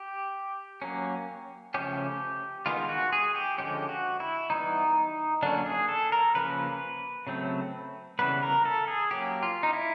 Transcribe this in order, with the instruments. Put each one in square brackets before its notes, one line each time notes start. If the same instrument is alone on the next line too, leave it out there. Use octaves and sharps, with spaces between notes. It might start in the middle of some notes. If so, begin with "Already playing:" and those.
Already playing: [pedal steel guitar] G4
F#3 A#3 C#4
C#3 F3 A3 C#4 G4
D#3 G#3 B3 F4
F#4
G#4
G4
D3 F3 G#3 C#4 G4
F#4
E4
E3 G3 B3 D#4
D3 F#3 A#3 C#4 D4
G#4
A4
A#4
C#3 F3 A#3 C#4 B4
C#3 F#3 A3 C4
C#3 E3 G3 B3 B4
A#4
A4
G#4
F#3 A#3 C#4 G4
F4
D#4
E4